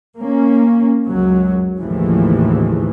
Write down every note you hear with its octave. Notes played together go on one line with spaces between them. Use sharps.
A#3 C#4
C#2 F#2 F#3
A1 D#2 A2 C#3 E3 F3